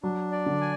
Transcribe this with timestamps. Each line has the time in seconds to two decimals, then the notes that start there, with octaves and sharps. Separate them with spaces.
0.03 F#3 D4
0.32 D5
0.46 D3
0.61 G#5